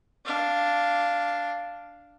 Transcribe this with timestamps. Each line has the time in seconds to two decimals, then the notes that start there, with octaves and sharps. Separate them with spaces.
0.25 D4 F5